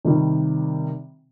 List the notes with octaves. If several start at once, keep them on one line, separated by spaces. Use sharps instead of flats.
C3 D#3 G3